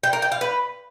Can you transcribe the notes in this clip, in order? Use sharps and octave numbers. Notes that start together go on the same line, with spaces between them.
G5
A#4
G5
F5
B4